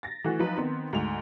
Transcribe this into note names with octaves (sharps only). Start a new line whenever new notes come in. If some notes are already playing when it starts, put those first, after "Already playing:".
A6 A#6
E3 A3 F#4
F3 F#3 D#4 B4
D#3 B3 C4
D2 G#2 F7